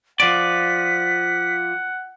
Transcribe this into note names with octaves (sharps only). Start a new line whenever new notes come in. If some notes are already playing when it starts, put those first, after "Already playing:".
F3 D5 F#5 B6